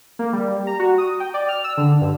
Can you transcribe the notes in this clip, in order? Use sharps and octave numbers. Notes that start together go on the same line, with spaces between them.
A#3
G3
A#5
F#4
D#6
G5
D5
F6
E6
D3
G2